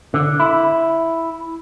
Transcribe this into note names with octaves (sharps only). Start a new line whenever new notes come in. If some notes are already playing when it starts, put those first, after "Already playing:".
D3
E4